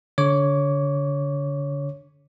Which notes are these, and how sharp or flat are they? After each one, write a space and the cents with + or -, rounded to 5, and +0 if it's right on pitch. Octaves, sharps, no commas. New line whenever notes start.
D3 -30 C#5 +0 D6 -20